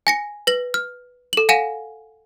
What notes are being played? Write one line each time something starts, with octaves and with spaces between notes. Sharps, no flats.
G#5 A#6 C#7
B4 A#6 F#7
F6
A4 F#7
F5 F#5 G#5 A#6 D#7 E7